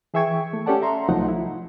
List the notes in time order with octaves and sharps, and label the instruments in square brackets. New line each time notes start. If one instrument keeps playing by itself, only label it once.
[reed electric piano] E3 G#4 E5 G5 C#6 G#6
A3
C#4 G4 A4 D5 F#5 A5
E5 A#5 C6
C2 F3 F#3 A3 D#4 F#5
E4